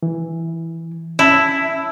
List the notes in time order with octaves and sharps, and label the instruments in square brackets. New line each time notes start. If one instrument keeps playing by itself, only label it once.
[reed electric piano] E3
[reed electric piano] C#4 E5 A5 [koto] E4